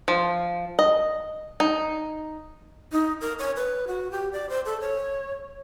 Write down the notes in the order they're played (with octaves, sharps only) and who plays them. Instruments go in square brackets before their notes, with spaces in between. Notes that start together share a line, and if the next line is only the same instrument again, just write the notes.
[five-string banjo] F3
D#5
D#4
[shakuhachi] D#4
A#4
C#5
B4
F#4
G4
D5
C5
A4
C#5